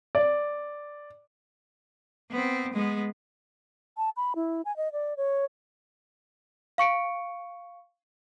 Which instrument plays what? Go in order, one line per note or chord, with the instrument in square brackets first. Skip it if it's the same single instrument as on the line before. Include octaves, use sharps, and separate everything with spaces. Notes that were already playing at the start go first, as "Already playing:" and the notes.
[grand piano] D5
[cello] B3 C4
G#3 B3
[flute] A5
B5
E4
G#5
D#5
D5
C#5
[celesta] F5 C#6 C#7 D7